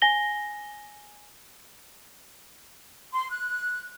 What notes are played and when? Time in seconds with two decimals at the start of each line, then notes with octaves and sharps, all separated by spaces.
0.02 G#5 A#6 G7
3.13 C6
3.30 F#6